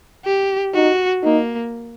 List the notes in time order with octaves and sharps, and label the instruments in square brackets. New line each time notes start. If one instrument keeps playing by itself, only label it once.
[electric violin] G4
[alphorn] D#4 [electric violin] F#4
[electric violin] A#3 [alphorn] D#4